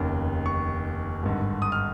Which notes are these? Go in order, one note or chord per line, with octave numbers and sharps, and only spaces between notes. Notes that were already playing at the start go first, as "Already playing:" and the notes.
Already playing: F1 D#2 C#3
C#6
G#1 G2 D3
D#6
F6